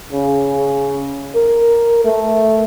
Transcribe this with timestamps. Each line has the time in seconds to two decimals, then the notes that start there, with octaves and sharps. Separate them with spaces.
0.12 C#3
1.35 A#4
2.04 A3